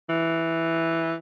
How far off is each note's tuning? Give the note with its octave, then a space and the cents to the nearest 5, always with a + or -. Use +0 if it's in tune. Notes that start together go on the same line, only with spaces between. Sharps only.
E3 +0